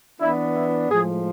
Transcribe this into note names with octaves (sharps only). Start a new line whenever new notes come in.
E3 B3 D4 E4
E4
A2 F3 G#3 G#4